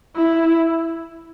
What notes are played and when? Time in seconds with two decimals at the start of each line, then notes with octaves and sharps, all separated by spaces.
0.15 E4